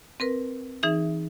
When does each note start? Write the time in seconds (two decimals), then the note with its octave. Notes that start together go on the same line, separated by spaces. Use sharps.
0.20 C4 A#4 B4
0.83 E3 D#4 G#4 E5